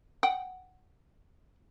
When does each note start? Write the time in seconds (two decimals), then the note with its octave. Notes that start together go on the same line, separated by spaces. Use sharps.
0.23 F#5 G5